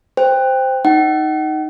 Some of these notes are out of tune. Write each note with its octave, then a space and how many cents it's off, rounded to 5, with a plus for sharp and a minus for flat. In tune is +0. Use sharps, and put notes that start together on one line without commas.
C5 -5 G5 +15
D#4 +0 F#5 +35